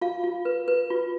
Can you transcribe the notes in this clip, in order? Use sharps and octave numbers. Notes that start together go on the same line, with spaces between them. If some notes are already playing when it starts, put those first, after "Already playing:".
F4 F5
F4
B4
B4
F4